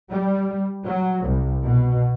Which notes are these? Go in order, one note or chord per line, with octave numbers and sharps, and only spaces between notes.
G3
F#3
C2
B2